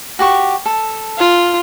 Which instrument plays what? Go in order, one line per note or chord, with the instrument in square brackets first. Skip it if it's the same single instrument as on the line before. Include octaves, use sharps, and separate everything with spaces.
[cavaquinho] F#4 G4 C#6
A4
[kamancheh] F4